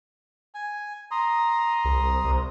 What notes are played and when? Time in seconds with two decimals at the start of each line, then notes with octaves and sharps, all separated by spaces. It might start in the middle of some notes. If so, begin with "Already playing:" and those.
0.54 G#5
1.11 A#5 C6 D#6
1.85 C2
2.24 C2